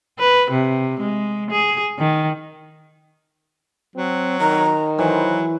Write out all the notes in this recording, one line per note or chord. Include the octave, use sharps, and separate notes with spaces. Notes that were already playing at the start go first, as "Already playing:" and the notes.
B4
C3
G#3
G#4
D#3
F#3 C4
D#3 A#5
E3 F#3 C5